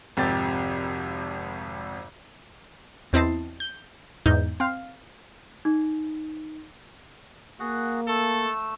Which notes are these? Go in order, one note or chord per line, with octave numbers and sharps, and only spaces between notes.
G#1 F2 C3 G4 A6
E2 C4 E4 D#5 A5 C7
G6
E2 G#2 D#4 G6
C4 F5
D#4
A#3 F#4 G#4 F#5
A3 A4 E6